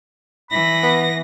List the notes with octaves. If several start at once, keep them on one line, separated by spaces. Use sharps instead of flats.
E3 B5 A#6
B3